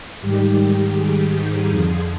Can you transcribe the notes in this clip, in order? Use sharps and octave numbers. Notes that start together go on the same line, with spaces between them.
G#2 D#3 G3 G4
G#4
D#4
F2 D3 F3 G#4